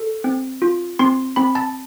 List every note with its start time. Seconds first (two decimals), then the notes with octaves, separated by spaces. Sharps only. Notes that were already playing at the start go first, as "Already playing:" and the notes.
Already playing: A4
0.24 C4
0.62 F4
0.99 C4 C6
1.36 C4 B5
1.55 A5